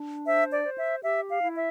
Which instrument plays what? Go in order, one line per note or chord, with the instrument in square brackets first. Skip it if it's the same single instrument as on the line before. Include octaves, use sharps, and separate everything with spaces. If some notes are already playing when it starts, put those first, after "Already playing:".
Already playing: [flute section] D4
C5 E5
D5
C5
E5
G4 E5
F5
E4
E5